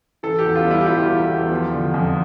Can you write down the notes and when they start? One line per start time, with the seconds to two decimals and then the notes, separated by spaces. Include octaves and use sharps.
0.23 E3 A4
0.39 G4
0.45 E2
0.56 F4
0.66 G3 E4
0.81 G4
0.87 E1 F4
1.08 E3
1.30 E2
1.51 F3
1.72 D3
1.94 F2